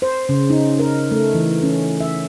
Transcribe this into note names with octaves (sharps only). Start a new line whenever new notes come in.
C5
C#3
D#4
A#4
A3
E3
C#4
E5